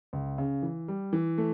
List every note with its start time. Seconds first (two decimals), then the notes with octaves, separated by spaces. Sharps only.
0.13 C#2
0.38 C#3
0.63 E3
0.88 G3
1.13 E3
1.38 A3